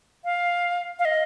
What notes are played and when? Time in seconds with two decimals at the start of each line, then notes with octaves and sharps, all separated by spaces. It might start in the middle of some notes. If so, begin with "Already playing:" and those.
0.25 F5
0.99 F5
1.05 D#5